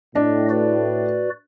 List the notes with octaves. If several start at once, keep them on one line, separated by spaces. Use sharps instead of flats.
A2 D4 D#5
F#4 B4 D5